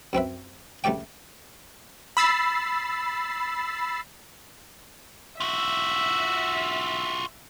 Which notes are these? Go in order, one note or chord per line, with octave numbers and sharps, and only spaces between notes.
F#2 C4 B4 E5
C#2 A3 G4 D5 G5
B5 E6 A6 C7
F4 F#4 E5